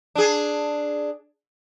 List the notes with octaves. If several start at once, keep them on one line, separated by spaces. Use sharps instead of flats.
D4 G#4